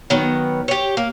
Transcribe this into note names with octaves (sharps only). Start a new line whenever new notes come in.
D#3 F#3 B3
G4 C#5
A#3